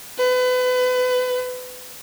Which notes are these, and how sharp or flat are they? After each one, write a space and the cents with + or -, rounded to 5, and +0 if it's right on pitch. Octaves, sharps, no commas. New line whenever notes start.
B4 +30